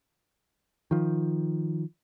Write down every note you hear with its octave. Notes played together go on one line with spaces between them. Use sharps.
D#3 F3